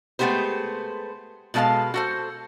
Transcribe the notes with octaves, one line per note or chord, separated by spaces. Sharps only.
G#3 A3 B3 D4 G4 C5
B2 G#3 A4 C5 F5 A5
F#4 A4 C5